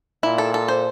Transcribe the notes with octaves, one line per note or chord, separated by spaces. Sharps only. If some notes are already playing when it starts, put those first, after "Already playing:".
A#2 E4
A4
A4
C5